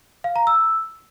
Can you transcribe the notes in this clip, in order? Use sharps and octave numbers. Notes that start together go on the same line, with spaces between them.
F5
A#5
E6